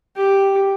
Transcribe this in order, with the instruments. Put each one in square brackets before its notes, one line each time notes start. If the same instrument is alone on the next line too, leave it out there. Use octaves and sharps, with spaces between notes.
[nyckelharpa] G4